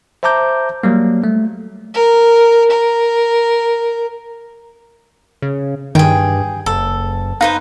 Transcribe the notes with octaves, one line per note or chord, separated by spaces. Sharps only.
C5 E5 A5 A#5 D6 G6
F#3 G3 A#3
A3
A#4
A#4
C#3
G2 D#3 G#4 G5
F#1 A4
D#4 B4 C5 F5